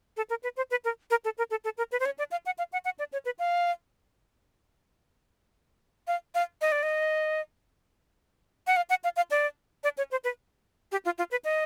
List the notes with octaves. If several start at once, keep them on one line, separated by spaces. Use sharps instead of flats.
A4
A#4
B4
C5
B4
A#4
A#4
A4
A#4
A4
A4
A#4
B4
C5
C#5
D5
F5
F#5
F5
F#5
F#5
D5
C#5
B4
F5
F5
F5
D#5
D5
D#5
F#5
F5
F#5
F5
F5
D5
D5
C#5
C5
B4
G4
F4
F4
B4
D#5